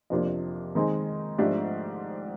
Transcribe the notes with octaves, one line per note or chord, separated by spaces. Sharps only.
F2 C3 F3 A#3 D4
D#3 G#3 C4 D#4 G#4
G#2 F3 A3 D4 G4